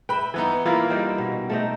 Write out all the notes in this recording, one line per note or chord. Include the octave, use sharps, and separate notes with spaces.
B4 E5 G5 B5
E3 B3 D#4
E3 A#3 E4 F4
G3 C4 D#4
B2
A3 C4 D#4